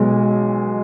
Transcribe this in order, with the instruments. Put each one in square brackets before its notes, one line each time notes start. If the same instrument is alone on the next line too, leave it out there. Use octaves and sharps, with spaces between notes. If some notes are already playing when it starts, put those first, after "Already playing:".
Already playing: [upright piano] B1 B2 G#3